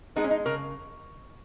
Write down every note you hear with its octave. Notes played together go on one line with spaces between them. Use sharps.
G#3 B3 D#4
C#4
D#4
C#3 A#4